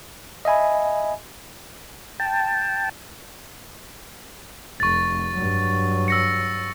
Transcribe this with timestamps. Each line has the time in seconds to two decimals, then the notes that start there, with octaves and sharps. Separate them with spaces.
0.45 D#5 E5 G#5 B5
2.20 G5 A5
4.80 F1 C#6 A6
5.35 G2 F#3
6.08 E6 A#6 C#7